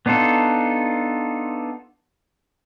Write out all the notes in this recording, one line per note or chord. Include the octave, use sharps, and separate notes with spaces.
B3 D4 D#4 F4 A4